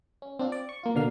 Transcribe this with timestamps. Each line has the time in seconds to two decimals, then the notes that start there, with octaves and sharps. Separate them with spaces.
0.22 C#4
0.39 C4 D4 F4
0.52 D5
0.69 C#6
0.83 A#3 F4
0.95 B2 D3 A#3 F5 F6